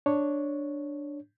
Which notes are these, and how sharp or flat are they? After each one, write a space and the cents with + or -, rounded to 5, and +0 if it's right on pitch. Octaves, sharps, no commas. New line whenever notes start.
D4 +0 C#5 +0